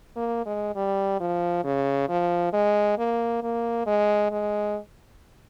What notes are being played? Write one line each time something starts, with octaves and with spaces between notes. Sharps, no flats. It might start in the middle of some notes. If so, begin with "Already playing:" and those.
A#3
G#3
G3
F3
C#3
F3
G#3
A#3
A#3
G#3
G#3